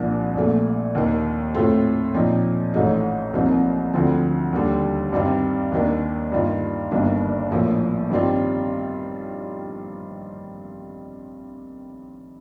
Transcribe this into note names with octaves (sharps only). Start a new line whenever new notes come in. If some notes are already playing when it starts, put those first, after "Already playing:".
Already playing: C2 A#2 F3 A#3 D4
A#1 A#2 A3
D#2 D#3 A#3
A2 A3 C4 F4
A#2 F3 C4 D#4
A1 A2 A3 D#4
C2 C3 F3 A#3 D#4
D2 D3 F3 C4
D#2 D3 G3
G2 D#3 G3 C4
D#2 D#3 A#3 D4
G2 D#3 A#3 F4
G1 G2 D#3 A#3 D4
A#1 A2 F3 A#3
G2 D#3 G3 C4 F4